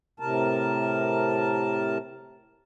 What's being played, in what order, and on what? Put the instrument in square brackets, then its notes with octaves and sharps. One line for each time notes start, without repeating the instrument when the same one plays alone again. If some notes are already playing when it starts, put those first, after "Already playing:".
[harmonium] A2 C3 A#4 A5